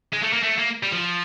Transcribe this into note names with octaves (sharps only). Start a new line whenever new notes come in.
G#3
A3
A#3
A3
A#3
G3
F3